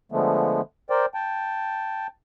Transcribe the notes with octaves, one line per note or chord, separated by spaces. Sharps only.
D3 F3 G#3 A3 B3
A#4 C5 D5 G5
G5 A5